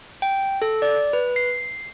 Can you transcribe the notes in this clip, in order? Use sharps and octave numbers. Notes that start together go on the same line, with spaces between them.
G5
A4
D5
B4
C7